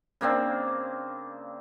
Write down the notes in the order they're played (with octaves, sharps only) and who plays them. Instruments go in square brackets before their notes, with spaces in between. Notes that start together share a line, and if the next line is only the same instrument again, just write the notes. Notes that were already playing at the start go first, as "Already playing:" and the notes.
[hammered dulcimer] C#3 A#3 C4 D4